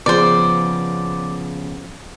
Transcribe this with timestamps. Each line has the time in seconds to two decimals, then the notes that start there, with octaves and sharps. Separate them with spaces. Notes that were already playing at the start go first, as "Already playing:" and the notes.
0.06 C#3 F3 B3 C5 D5